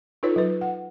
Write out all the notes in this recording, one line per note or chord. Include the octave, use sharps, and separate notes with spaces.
D#4 F4 A4 B4 C#5
F#3 B4
F#5